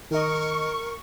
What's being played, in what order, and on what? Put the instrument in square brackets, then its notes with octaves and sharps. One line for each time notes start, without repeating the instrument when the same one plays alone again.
[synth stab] D#3 D#5 [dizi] A#4 [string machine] C#6